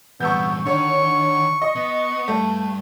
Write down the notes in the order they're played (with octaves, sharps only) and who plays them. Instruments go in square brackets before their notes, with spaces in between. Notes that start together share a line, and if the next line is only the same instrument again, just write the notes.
[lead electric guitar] E2 G2 [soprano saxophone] B3 [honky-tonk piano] C#6 E6 G6
[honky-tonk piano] D3 C#5 [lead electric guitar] D#3 [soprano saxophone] C#6
[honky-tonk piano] D#5 [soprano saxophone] C#6
[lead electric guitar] B3
[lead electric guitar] G2 [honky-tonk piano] A3